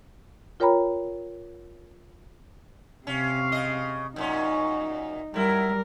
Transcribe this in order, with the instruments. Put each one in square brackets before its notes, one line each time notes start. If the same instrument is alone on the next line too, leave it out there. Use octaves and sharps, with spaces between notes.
[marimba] F4 A#4 C#5 G5 A#5 B5
[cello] C3 F5 [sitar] C#4
[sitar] C#3 D#5
[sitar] F#2 A#2 C#4 [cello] D#4
[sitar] F#2 E4 [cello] G3 A#4